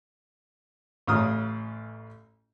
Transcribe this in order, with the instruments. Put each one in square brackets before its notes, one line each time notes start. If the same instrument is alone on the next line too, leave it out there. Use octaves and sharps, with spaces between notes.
[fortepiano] A1 C#3 F4 A#5 D#6 F6